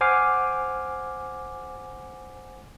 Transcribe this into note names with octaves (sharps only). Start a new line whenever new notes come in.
C5 F#5 G#5 D6 F6 C7